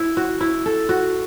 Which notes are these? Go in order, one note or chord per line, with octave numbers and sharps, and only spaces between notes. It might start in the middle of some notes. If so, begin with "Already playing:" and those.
Already playing: E4
F#4
E4
A4
F#4